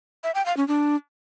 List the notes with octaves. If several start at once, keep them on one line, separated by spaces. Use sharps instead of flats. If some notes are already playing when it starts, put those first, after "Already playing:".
E5
G5
F5
C#4
D4